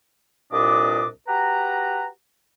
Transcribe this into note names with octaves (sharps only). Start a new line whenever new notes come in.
C2 G2 A#2 D4 D#5 D6
F#4 G4 B4 A#5